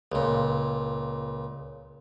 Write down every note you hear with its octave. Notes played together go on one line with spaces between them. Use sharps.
C#2 A#2